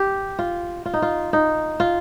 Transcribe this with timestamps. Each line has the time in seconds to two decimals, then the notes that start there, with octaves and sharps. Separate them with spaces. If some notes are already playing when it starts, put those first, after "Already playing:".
Already playing: G4
0.39 F4
0.86 F4
0.93 D#4
1.02 F4
1.33 D#4
1.80 F4